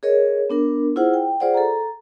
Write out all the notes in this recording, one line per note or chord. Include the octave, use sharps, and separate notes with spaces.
G#4 A#4 C#5 D#5
B3 D4 A#4
E4 F4 G#4 C5 F#5
G5
F4 G#4 C5 D5 F#5
A4 A#5